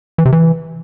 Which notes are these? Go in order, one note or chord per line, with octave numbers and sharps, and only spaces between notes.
E3
C3
E3